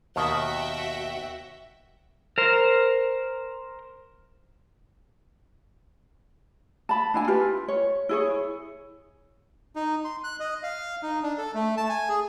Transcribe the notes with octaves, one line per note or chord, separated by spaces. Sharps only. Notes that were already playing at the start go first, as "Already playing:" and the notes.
D#2 B2 D#3 F#4 E5 G5
A#4 C5
A5 B5
D4 E4 G#5
F4 G4 B4
C#5
E4 G#4 C#5
D#4
C6
F#6
D#5
F5
D#4
D4
A4
A3
A5
G#5
G#4